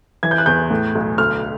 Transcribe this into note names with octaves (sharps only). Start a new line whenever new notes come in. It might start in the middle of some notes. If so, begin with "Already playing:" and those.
E3 G#6
G6
F#6
E2 G6
A2
B1
D2 F6